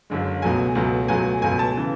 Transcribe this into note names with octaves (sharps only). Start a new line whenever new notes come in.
F#1 F#2 D3 G#3
C#2 B2 F#3 A3 G#5
C#2 B2 F#3 A3
C#2 B2 F#3 A3 G#5
C#2 B2 F#3 A3 G#5
A5
C#3 E3